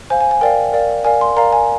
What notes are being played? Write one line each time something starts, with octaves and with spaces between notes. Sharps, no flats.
C5 F5 G#5
G#5
G#5
A#4 D5 F5 G5
A#4 D5 F5
A#4 D5 F5 G#5
C6
A#4 D5 F5 A#5
G#5